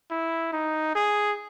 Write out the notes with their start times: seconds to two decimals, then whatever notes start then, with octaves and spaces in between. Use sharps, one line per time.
0.11 E4
0.53 D#4
0.95 G#4